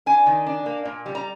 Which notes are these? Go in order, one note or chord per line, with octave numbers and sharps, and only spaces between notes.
D4 G#5
D#3
D4
A#3
A#2
G3
A#5